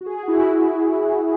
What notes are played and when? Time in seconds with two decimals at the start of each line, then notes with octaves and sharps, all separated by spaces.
0.01 F#4
0.06 G#4
0.23 F#4
0.28 E4